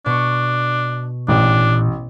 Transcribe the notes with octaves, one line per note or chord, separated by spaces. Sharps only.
B2 D4 C#6
A1 A#2 D4